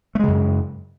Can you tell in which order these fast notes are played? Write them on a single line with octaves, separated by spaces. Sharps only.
A3 G#3 C#3 F#2